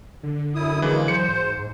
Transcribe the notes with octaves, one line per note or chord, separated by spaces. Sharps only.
D3
F#2 E4 D#6
C#3 E3 G#3 A#3
F#3 C5 C#7
G#2
G#2